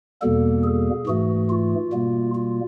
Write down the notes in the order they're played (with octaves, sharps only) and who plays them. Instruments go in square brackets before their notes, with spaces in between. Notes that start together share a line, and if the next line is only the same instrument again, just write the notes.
[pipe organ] E2 B2 G3 A#3 A4
G#4
G#2 E3 A3 F#4
F4
B2 G3 A#3
F4